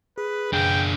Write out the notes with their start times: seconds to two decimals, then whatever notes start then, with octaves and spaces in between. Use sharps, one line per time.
0.18 G#4 B4
0.53 F#2 C#3 D4 G#4 G5